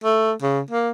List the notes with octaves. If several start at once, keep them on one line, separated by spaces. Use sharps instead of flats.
A3
C#3
A#3